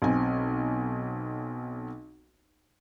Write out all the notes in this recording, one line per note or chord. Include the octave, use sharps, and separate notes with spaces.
B1 C4 G#5